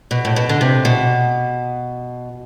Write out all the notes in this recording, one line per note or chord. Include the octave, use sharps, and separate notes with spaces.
B2
A2
B2
D3
C3
B2